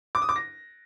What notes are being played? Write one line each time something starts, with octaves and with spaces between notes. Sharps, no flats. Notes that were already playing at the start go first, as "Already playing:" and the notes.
D6
D#6
D6
A#6